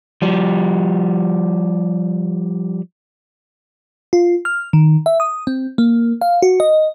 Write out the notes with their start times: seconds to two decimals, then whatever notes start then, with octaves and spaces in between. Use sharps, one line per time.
0.22 F3 G3
4.13 F4
4.45 F6
4.73 D#3
5.06 E5
5.20 D#6
5.47 C4
5.78 A#3
6.21 F5
6.42 F#4
6.60 D#5